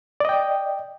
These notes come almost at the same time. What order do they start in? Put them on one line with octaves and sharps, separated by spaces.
D5 D#5 G5